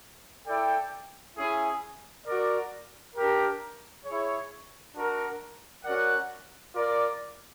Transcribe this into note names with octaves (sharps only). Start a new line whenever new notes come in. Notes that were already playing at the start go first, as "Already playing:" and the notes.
E4 A4 D5 G5
C#4 E4 G#4
F#4 A#4 D5
D4 G4 A#4
E4 G#4 C#5
D4 F#4 A#4
C#4 F#4 A#4 D5 F#5
F4 A#4 D5